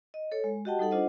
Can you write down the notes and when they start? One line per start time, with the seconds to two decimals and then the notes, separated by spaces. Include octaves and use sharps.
0.14 D#5
0.32 A4 C#5
0.44 G#3
0.65 F#4 G4 D#5 F#5 G5 A5
0.79 G3 D#4 A4 F#5
0.91 D4 F4 C5 D#5 F#5